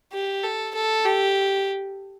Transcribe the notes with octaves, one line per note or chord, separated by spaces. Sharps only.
G4
A4
A4
G4